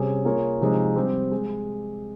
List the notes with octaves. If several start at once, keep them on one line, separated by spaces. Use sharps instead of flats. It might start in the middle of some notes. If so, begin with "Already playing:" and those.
Already playing: C3 G3 C#4 G#4
A#3 F4 G#4 C#5
C3 F3 G#3 D#4
G3 C4 G4
G#3